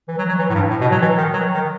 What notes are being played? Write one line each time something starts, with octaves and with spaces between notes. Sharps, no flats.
E3
F#3
F#3
E3
A2
G2
A2
B2
F#3
E3
D#3
F#3
D#3